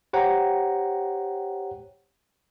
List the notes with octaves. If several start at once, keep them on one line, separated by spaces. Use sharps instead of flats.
G4 C5 C#5 F#5 G5 A#5